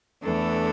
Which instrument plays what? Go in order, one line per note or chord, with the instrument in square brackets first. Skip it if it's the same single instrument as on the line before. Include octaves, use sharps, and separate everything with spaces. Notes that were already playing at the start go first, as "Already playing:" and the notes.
[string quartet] E2 E3 A3 D4 A4